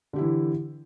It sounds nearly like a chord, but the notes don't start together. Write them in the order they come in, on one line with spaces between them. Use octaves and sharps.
D3 G4 E4 E3